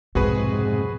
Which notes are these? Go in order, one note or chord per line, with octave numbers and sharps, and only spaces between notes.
B1 F2 G#2 C3 F#4 G#4 B4